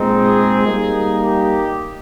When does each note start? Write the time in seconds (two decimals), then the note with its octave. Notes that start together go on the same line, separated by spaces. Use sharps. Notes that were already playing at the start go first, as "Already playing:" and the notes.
Already playing: A#2 G#3 C4 D#4
0.09 G#4
0.65 G3 A#3 D#4
1.22 G4